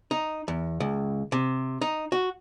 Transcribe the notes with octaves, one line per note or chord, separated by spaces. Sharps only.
D#4
E2
C#2
C3
D#4
F#4